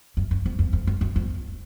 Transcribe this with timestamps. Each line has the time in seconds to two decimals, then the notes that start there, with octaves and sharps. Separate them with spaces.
0.17 F#2
0.31 F#2
0.46 F2
0.59 F2
0.73 F2
0.87 F#2
1.01 F#2
1.16 F2